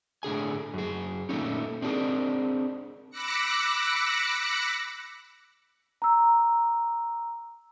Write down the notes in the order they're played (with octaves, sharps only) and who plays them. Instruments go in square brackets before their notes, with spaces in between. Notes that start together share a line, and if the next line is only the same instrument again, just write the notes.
[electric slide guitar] A2 D3 G#4 G#5
F#2 G#4
A#2 F3 A3 A#3 C#4 D#4
C4 D4 F4 G#4 A#4
[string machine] B5 D6 E6 F#6 A#6 C#7
[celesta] A#5 E6